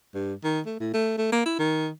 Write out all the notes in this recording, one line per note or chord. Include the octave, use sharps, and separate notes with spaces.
G2
D#3
A3
A2
A3
A3
A#3
E4
D#3